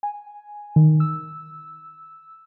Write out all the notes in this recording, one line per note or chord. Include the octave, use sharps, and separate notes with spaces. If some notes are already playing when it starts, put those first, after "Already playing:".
G#5
D#3
E6